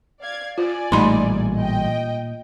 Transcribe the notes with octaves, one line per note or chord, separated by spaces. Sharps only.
D5 F5 G#6
F4 D5 G#5
A1 A#2 G3 A3 D#4 B5 C6
D#5 G5